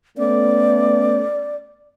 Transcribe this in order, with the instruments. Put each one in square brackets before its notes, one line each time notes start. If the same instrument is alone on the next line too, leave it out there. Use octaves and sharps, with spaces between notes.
[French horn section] A3 B3 C#4 [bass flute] D5